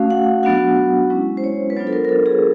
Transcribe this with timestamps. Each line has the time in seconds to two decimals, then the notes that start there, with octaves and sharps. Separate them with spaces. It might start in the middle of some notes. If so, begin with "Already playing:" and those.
Already playing: A3 C#4 F#4 F5
0.10 F#5
0.43 F#3 B3 D4 F#4 F#5
1.10 G#3 C#4 E4
1.37 C5
1.44 C#5
1.70 B4
1.76 F#3 B3 D4 F4 C5
1.87 A4
1.93 A#4
2.05 A#4
2.09 A4
2.26 G#4